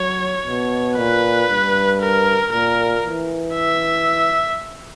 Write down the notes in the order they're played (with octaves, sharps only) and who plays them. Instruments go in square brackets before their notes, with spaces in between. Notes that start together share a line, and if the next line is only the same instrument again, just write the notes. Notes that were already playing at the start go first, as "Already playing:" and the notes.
Already playing: [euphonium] F#3 [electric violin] C#5
[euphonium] B2
[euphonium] A#2 [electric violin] B4
[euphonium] G2
[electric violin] A#4
[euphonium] A#2 [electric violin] A#4
[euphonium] E3
[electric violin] E5